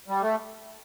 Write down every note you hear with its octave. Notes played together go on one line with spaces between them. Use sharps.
G3
A3